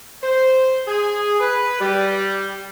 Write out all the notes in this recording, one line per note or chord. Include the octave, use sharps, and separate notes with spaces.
C5
G#4
B4
G3